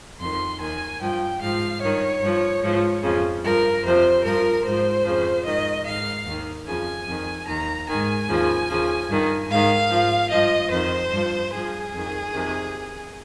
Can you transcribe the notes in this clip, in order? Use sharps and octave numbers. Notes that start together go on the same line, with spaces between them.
F2 D#3 C6
D#2 D#3 G#5
G2 F3 G5
G#2 F3 F5
G2 D#3 C#5
G2 F3
G#2 F3
F2 C#3 F3
G2 F3 A#4
F2 C3 F3 C5
G2 F3 A#4
G#2 F3 C5
F2 C#3 F3
G#2 D#3 D#5
G#2 D#3 F5
D#2 D#3
F2 C#3 F3 G#5
F2 D#3
D#2 D#3 A#5
G#2 D#3 G#5
D#2 C#3 F3
D#2 C#3 F3
G2 D#3
G#2 D#3 F5
G#2 F3
G2 F3 D#5
F2 D#3 C5
G2 F3
G2 F3 G#4
F2 D#3
F2 C3 D#3